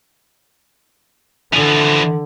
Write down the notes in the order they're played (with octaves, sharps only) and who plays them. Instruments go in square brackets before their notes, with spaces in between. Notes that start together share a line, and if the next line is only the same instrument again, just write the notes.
[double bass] D3 [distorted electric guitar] E3 F3